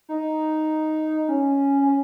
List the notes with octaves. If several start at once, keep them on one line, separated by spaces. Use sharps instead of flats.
D#4
C#4
C#4